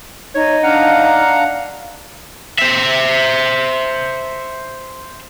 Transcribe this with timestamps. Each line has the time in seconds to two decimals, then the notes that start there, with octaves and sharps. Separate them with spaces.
0.35 D#4 C#5
0.64 D4 F5 F#5 A#5
2.59 C5 E5